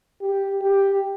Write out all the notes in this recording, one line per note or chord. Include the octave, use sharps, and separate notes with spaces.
G4
G4